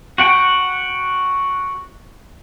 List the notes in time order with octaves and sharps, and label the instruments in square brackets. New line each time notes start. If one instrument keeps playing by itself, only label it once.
[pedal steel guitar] F#4 F#5 G5